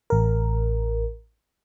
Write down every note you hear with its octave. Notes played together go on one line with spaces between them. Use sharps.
A1 A#4